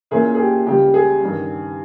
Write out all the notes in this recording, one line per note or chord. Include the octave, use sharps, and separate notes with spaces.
A#2 A#3 C#4 E4 G#4
G#4
G4
C#2 C#3 G3 G4
G#4
G2 D#3 G3 C#4